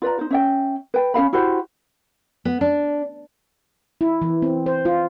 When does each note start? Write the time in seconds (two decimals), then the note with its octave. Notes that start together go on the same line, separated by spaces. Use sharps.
0.02 F4 B4 D5 A#5
0.19 D#4 C5
0.31 C#4 E5 G5
0.94 B4 G5
1.14 C#4 A4 F5 B5
1.33 E4 F#4 G4 C5
2.45 B3
2.61 D4
4.01 E4
4.22 E3
4.42 C4
4.66 C5
4.85 F4